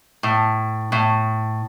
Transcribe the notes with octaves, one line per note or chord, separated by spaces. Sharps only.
A2
A2